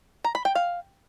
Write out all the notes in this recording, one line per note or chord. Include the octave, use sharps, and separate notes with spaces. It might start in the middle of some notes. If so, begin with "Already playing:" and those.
A#5
B5
G5
F5